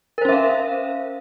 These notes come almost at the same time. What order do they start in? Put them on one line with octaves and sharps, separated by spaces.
A#4 C5 C#4 E5 F5